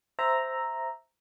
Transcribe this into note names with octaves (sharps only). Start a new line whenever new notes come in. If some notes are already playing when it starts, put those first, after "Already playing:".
C5 E5 A#5